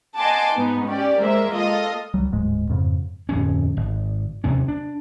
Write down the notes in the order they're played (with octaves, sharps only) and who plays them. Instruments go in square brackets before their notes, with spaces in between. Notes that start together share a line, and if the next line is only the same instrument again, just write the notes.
[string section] D#5 F#5 G#5 A5 C6 D6
G#2 B3 D#4
C#4 G4 D5
G#3 A#3 A#4 C5 E5
F4 A4 D#5
[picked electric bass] C#2 F#3 G3
D1 G#2 G#3
F2 G#2 C#3
[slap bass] D1 F2 C#4
G#1
D#2 C3 C#4
D4